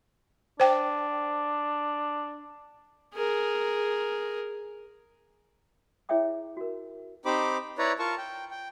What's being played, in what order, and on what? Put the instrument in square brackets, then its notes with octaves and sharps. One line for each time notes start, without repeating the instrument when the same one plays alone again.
[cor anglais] D4 [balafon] C5 G5
[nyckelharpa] G#4 A#4
[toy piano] E4 G#4 C#5 E5 G5 D6
F#4 A#4
[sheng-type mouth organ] C4 D#4 G4 C5 B5 D6
E4 B4 C#5 D5 A#5
F4 A#4 A5 C#6
G5
G5